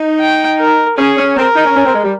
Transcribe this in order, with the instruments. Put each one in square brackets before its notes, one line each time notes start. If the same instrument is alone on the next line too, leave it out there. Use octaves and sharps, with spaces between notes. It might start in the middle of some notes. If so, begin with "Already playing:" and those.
Already playing: [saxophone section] D#4
[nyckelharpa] G5
A#4
[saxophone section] C#4 [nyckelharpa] G#4
[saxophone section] C#4
[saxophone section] C4 [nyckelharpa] A#4
[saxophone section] D#4
C#4
C#4
C4
G#3
G3